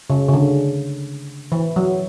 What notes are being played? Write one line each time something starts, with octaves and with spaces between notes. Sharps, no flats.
C#3
C#3
D3
E3
F#3